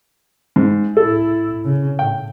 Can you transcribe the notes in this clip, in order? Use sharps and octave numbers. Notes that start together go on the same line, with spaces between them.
G#2
A2 E4 A4
C#3
A2 G5